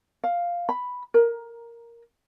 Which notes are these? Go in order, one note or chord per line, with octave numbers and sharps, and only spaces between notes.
F5
B5
A#4